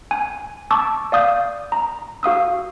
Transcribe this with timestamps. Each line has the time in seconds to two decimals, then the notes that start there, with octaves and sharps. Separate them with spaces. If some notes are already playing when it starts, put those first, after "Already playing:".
0.11 G#5
0.71 A5 C#6 D6 E6
1.12 D5 F5 D#6 G6
1.72 A#5
2.23 F#4 F5 D#6 E6